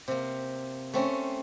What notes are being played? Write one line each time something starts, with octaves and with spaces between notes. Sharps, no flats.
C3 A#3
A3 C4 C#4